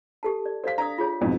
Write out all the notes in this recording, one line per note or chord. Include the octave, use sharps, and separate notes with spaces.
G4 A4 A5
D5
A4 C5 D5 F5 B6
D4 D5 A#5 D#6
F4 G#4 C#5
B1 F2 G#2